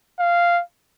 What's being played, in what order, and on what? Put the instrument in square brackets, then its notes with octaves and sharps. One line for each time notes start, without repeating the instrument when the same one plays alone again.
[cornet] F5